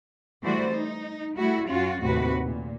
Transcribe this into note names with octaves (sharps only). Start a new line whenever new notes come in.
E3 G3 A3 F#4 C5 D5
D#4
G3 A3 E4 F#4
F#2 C#4 F4 F#4
D#2 A2 C3 C4 F#4 B4
A#2